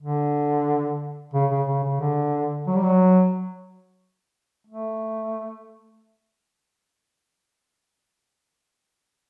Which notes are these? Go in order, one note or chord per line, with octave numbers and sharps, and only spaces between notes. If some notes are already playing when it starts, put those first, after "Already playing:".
D3
C#3
C#3
C#3
C#3
D3
F#3
G3
F#3
A3